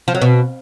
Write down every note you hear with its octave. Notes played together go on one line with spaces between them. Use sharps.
F3
F#3
B2